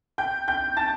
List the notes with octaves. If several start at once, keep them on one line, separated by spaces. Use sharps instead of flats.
G5 G6
G5 G6
A5 A6